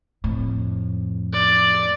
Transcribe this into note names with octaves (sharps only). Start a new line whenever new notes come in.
F2 A2
D5